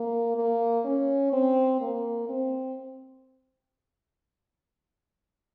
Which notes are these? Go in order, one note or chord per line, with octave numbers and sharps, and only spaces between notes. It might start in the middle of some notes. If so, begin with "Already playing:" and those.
Already playing: A#3
A#3
C#4
C4
A#3
C4